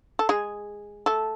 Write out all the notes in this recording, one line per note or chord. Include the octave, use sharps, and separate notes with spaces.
A4
G#3 G#4
A3 A4